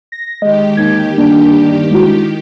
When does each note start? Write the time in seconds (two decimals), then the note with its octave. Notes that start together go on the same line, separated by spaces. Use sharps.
0.12 A#6
0.42 D#3 G#3 G4 D#5
0.77 D#2 G#6
1.18 G2 A#3 D4
1.91 G#3 E4 F#4